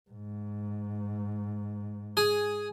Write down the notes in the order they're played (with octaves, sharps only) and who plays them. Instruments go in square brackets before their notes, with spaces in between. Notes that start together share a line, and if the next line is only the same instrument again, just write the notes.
[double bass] G#2
[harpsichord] G#4 G#5